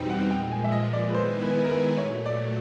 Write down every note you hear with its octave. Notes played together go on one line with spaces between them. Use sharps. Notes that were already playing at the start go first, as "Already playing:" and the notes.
Already playing: E2 B2 G3 C4 D#4 G5
F#5
A#2 F3 G#3 G5
G#5
E5
D#5
D5
B4
D#3 G#3 B3 E4 G#4 C5
B4
A#4
B4
A#2 F#3 A3 C#5
D5